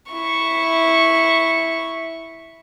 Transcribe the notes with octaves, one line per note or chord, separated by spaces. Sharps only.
E4 C#6